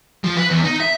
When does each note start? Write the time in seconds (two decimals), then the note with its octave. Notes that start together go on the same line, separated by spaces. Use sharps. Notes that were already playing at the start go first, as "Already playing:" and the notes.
0.24 F3
0.37 B4
0.50 E2
0.64 D#4
0.80 E5